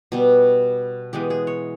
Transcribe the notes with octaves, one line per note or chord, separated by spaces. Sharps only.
B2 G3 B3
E3 G#3 B3 G4
G#4
C#5